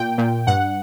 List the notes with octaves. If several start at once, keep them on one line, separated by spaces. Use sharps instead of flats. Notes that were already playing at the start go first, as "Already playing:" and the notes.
Already playing: A#2 G5
A#2
G2 F#5